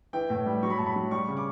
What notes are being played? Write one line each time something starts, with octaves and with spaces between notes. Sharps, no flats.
E3 G5
A2
G3
F#3 C#6
B5
A2 A5
B5
F#3
G3 C#6
C#3
D6